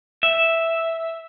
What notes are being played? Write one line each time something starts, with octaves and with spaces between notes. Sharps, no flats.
E5